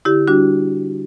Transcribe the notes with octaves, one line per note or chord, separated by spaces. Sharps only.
D3 E4 G4
G3 D4 F#4